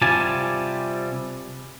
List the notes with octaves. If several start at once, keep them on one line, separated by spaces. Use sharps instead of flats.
C3 G3 F4 G4 G#5 A5